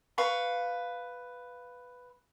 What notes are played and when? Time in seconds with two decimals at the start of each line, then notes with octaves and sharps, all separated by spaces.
0.18 B4 F5 C#6